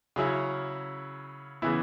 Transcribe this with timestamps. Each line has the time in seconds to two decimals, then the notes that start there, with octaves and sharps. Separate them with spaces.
0.16 C#3 F#3 C#4 E4
1.62 C#3 E3 B3 E4